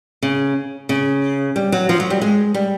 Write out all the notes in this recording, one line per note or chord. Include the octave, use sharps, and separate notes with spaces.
C#3
C#3
G3
F#3
F3
F#3
G3
G#3
G3